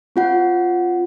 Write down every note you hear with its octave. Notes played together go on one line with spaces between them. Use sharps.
C4 F4 F#5